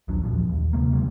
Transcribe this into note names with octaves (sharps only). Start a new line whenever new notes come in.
A#1 D#2 F#3 D4
E2 G2 A#2 F3
D#2
D2 C3 A3 A#3
D3 D#3 F#3 G3